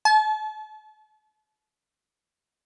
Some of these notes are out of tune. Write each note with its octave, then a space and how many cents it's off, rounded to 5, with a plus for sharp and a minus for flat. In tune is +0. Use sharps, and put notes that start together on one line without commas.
A5 -40